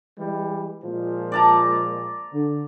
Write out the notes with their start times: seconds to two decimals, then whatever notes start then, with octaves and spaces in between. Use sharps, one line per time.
0.18 E3 G3 G#3
0.82 A#2 F3 G#3
1.32 D5 A5 A#5
2.32 D3